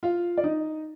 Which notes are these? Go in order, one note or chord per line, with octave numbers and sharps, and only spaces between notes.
F4 F5
D5
D#4 D#5